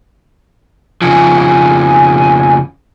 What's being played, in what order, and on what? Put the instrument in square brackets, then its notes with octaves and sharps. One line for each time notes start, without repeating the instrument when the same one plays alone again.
[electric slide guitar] F2 C#3 F3 [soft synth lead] G#5